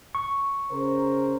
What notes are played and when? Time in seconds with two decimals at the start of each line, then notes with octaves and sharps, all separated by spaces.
0.15 C#6
0.71 C#3 A#4 C5